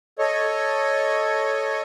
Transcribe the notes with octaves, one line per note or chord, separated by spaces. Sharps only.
A4 C#5 D#5